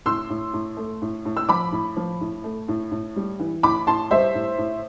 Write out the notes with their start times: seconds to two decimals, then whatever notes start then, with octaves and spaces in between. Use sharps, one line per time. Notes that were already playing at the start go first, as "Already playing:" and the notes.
0.06 A2 C6 E6
0.30 A2
0.53 A2
0.77 A3
1.02 A2
1.25 A2
1.37 E6
1.49 F3 B5 D6
1.72 A2
1.97 F3
2.21 A2
2.44 A3
2.68 A2
2.91 A2
3.16 G3
3.39 E3
3.63 A2 B5 D6
3.87 A2 A5 C6
4.11 G3 C5 E5
4.35 A2
4.58 A2